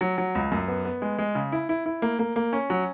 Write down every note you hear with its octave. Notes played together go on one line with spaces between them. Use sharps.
F#3
F#3
C#2
F#2
B3
B3
G#3
G#3
C#3
E4
E4
E4
A#3
A#3
A#3
C#4
F#3